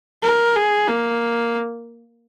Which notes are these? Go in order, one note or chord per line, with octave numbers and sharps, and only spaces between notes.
A#4
G#4
A#3